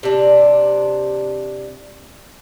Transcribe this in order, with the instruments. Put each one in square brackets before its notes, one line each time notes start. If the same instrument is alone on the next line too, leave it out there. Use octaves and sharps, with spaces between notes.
[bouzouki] C3 D4